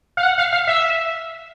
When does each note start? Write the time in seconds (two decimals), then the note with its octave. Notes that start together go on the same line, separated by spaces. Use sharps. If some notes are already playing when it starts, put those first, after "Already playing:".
0.17 F5
0.23 F#5
0.38 F5
0.53 F5
0.67 E5